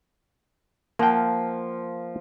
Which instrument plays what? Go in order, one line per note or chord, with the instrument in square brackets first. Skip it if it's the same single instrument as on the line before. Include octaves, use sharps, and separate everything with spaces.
[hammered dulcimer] F3 [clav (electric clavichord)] A#3 F#5 G5